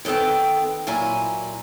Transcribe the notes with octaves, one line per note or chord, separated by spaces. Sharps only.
D#3 B3 C4 A4 G5
A#2 F#3 E4 G#5 A#5